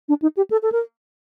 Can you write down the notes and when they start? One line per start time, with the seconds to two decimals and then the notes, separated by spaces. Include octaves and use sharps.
0.09 D4
0.22 D#4
0.37 G4
0.50 A4
0.62 A4
0.72 A#4